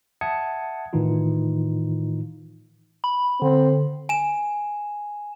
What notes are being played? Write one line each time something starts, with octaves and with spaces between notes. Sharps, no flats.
E5 F#5 A5 D#6 G#6 C#7
A2 D#3 E3 D#4 F4
B5
D3 C4
G#5 E7